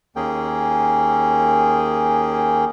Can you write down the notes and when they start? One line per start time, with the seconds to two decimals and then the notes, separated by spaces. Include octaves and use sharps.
0.16 D#2 A#3 C#4 G#4 G5